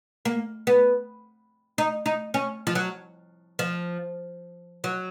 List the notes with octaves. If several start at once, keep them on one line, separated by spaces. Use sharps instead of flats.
A#3
B3
D#4
D#4
C#4
F3
F#3
F3
F#3